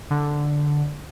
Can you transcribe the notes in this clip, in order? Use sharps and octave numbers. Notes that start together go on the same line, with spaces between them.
D3